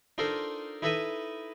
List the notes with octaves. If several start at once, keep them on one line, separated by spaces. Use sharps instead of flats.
D4 D#4 F4 A4 A#4 C5
D#4 E4 A4 B4 D#5 E5